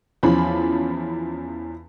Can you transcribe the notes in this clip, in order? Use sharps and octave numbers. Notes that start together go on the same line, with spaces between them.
E2 F3 C#4 B5